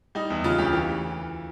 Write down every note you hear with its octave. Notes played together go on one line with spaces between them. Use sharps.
G3 D#4
E2
C#3 F4
D2 G4
E3